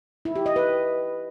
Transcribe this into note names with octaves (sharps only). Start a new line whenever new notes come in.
E4
G4
D#5
B4